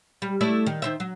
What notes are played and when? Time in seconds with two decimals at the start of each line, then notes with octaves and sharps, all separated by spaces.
0.22 G3
0.41 A3 E4 D5
0.66 D#3
0.82 D#3 C5 E5
1.00 F#3